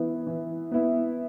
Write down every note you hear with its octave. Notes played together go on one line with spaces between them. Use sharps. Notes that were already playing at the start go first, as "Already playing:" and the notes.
Already playing: E3 B3 E4
E3
B3 E4